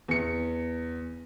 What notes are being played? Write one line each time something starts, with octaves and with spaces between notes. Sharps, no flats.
E2 C#7